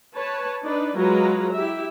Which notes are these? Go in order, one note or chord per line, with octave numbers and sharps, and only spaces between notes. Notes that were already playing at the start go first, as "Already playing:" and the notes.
B4 C#5 A5
D4 D#4 B4 D5
F#3 G#3 F4 B4 A#5
E4 G4 E5